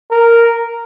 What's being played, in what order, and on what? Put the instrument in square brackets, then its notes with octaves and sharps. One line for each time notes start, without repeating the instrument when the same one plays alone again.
[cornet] A#4